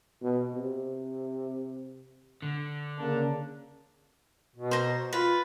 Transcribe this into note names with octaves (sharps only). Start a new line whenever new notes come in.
B2
C3
D3
C#3 A#3 D4
B2
C5 A#5
F4 B4